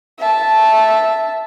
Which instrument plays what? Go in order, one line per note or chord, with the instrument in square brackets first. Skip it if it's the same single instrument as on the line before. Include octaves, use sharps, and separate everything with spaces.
[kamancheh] E5 A5